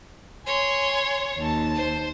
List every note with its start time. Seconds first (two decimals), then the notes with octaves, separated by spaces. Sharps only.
0.46 C#5 G#5 C6
1.37 D#2 A5
1.75 C5